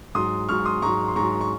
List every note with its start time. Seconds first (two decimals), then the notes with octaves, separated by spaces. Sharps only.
0.15 G#2 F#3 C6 D#6
0.49 G#2 F#3 C#6 F6
0.65 C6 D#6
0.82 G#2 F#3 A#5 C#6
1.08 C6
1.16 G#2 F#3 A#5 C#6
1.41 C#6